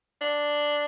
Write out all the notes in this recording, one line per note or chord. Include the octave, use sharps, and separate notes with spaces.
D4